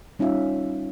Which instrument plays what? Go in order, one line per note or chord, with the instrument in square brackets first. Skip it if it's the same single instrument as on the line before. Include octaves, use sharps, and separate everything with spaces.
[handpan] G3 C#4 D#4 F4 E5 F5